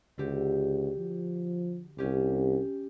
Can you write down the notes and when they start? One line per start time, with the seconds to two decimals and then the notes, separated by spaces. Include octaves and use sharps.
0.18 C#2 D3 F#4 G4
0.99 F3
1.98 C2 C#4 G4